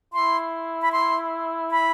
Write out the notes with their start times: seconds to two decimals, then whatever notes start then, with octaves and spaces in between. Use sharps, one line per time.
0.14 E4 C6
0.82 B5
0.92 C6
1.71 B5